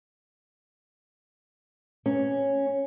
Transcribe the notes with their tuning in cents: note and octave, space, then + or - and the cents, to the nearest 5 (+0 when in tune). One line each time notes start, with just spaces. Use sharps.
C#4 -5